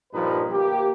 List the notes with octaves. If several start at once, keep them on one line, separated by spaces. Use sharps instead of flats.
G2 A#2 F3 D#4 B4
D2 A#3 G4